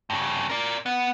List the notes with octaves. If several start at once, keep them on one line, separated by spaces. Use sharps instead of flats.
G2 C#3
A#4 D5
B3